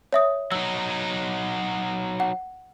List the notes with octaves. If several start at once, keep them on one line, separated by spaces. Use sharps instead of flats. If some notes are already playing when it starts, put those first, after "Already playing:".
C#5 E5 D#6
F#3 D#4 E6
F#5